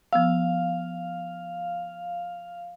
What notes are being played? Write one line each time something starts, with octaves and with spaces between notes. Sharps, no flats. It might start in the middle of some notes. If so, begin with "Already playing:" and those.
F3 B3 F5 E6